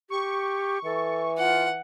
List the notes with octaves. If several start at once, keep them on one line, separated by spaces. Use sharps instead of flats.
G4 C#6
E3 A4
F4 F#5